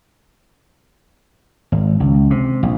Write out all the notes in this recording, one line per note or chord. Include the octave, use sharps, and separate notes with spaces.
G#1
C#2
C3
A#1